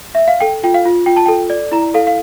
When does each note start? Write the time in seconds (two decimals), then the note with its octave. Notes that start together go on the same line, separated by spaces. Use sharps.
0.15 E5
0.28 F5
0.40 A4 G5
0.63 F4 G5
0.74 F5
0.85 F4
1.06 F4 G5
1.16 A5
1.26 A4 G5
1.50 D5
1.72 E4 A#5
1.94 A4 F5
2.07 F5